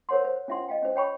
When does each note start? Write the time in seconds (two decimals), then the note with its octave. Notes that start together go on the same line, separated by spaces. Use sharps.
0.09 A#4 C5 C#5 F#5 C6
0.25 C5
0.48 C#4 F4 E5 F#5 C6
0.68 D#5 F5 G5
0.82 C#4 C5
0.96 C#5 G5 B5 C#6